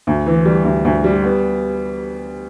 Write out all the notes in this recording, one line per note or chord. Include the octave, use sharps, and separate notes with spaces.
D2
E3
G3
D2
D2
G3
B3